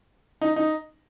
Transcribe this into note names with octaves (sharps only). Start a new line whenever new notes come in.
D#4
D#4